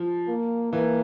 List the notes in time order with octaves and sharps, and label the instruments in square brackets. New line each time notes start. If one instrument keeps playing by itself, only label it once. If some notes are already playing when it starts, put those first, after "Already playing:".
Already playing: [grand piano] F3
[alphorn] A#3
[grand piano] E3 [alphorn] A#3